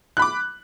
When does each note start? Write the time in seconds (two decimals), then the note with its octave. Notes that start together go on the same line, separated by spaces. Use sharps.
0.17 F#6
0.19 B5
0.22 D6